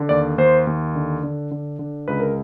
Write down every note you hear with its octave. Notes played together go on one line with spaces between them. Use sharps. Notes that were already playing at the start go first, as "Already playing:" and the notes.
Already playing: D3
D#2 D5
D#2 C5
D#2
D3
D3
D3
D3
C#2 B4
A#4